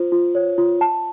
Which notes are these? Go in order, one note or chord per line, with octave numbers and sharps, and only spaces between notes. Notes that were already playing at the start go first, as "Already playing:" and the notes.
Already playing: F4 C5
F4
C#5
F4
A5